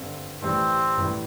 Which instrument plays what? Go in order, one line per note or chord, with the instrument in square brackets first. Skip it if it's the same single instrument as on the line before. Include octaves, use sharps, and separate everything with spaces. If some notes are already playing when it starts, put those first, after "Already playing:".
Already playing: [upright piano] G2 D3 C4
[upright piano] A1 A2 E3 G3 [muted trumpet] C4
[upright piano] A1 A2 E3 G3